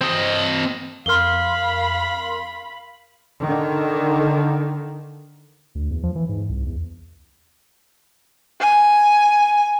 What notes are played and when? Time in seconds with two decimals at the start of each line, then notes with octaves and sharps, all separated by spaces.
0.01 C4 D#5
1.06 F2 A#4 F5 B5 C6 F6 G7
3.41 D3 D#3
5.75 D2
5.91 E2
6.03 F3
6.15 E3
6.29 G#2
6.49 C2
6.66 E2
8.61 G#5